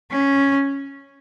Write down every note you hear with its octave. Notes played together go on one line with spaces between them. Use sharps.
C#4